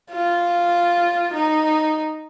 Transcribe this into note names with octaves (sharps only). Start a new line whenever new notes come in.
F4
D#4